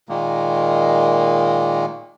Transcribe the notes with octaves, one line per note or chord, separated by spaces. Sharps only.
A#2 D#3 G#3 A#3